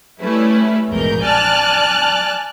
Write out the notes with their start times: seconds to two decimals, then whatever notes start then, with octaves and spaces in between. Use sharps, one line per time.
0.21 G3 A3 C#4 E4 B4
0.89 A#1 E2 G#2 B2 A#4 G6
1.23 D5 G#5 A5 F6 F#6